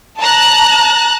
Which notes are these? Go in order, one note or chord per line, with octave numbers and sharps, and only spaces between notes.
A5 A#5 F#6